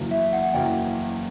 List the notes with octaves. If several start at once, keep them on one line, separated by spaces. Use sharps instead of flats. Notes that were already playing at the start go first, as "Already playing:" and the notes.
Already playing: F#1 E2 C#3 F#3 A#3
E5
F#5
F#1 E2 C#3 F#3 A#3 G5